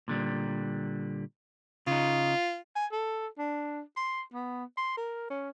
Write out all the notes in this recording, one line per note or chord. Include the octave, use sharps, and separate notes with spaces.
A#2 D3 G3
C#3 D#4 F4
G#5
A4
D4
C6
B3
C6
A#4
C#4